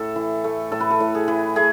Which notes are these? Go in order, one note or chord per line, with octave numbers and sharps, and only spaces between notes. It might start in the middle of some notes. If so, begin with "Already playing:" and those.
Already playing: A2 A4
E3
A3
A2 A4
B4
A4
A2
G#4
E3
A3 G#4